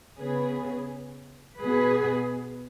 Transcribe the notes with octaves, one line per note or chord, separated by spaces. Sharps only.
C#3 B3 G#4 B4
B2 B3 G#4 B4